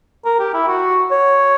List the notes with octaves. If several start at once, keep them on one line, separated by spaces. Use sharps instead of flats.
A#4
G4
E4
F#4
C#5